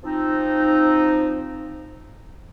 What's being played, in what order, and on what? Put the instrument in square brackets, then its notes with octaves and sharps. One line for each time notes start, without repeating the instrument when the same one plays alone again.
[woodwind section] F3 C4 D#4